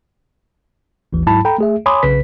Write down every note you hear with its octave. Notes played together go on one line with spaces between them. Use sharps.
G#1 D#2 E3
G#2 F#3 E4 A5 B5
A4 G5 A#5 B5
A3 G#4 E5
C#5 G#5 B5 C6 D6 D#6
B1 C#3 B4 B6